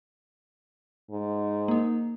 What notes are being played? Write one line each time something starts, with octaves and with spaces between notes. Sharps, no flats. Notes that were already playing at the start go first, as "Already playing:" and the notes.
G#2
A#3 D#4